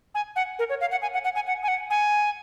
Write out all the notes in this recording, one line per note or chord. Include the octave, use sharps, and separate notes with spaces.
G#5
F#5
A#4
C#5
F5
F#5
G#5
F#5
F#5
G#5
F#5
G#5
F#5
G#5